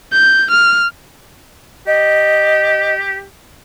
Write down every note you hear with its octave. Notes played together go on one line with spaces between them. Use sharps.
G6
F6
G4 D#5